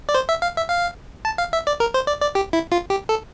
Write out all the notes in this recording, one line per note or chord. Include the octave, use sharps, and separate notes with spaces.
D5
C5
E5
F5
E5
F5
A5
F5
E5
D5
A#4
C5
D5
D5
G4
E4
F4
G4
A4